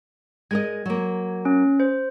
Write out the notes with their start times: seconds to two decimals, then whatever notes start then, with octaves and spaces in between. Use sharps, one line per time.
0.51 G#3 A#4 D#5 G#6
0.86 F#3 A#3
1.45 C#4
1.80 C5